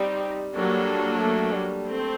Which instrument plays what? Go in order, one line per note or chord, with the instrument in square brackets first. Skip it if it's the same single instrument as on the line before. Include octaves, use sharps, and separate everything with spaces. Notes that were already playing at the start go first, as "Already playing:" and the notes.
Already playing: [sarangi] G3 [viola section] C4 D#4 G4
[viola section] F#3 A#3 D4 A4 [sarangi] G3
[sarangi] A3
G3
[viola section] A3 C4